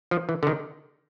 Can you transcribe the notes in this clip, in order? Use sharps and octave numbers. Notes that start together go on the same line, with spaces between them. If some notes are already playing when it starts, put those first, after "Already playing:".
F3
E3
D3
D#3